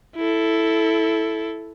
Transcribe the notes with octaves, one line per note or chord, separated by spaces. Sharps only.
E4 A4